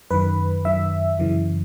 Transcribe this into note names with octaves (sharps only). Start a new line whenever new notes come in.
F#2 D#3 B4
F#2 D#3 E5
F#2 C#3 E3